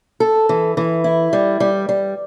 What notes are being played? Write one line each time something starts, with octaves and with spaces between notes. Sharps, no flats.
A4
E3
E3
E4
G3
G3
G3